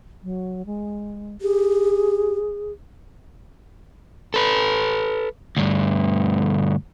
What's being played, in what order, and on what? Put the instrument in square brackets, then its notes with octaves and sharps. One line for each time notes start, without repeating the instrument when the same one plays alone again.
[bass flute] F#3
G#3
[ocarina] G4 [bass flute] G#4
[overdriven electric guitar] A4 B4
D2 G2